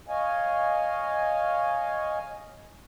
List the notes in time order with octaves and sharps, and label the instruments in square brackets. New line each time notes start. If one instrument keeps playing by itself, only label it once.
[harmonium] C#5 D#5 F5 G#5